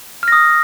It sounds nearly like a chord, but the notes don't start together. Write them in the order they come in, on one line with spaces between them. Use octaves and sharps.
F6 A#6 D#6